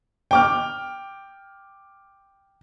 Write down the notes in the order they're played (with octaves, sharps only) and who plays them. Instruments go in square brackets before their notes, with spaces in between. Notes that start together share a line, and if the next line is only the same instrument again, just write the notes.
[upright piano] G5 D6 F6